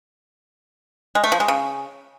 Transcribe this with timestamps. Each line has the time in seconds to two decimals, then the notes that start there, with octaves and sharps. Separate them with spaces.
1.15 G#3
1.24 A3
1.32 F3
1.40 G#3
1.48 C#3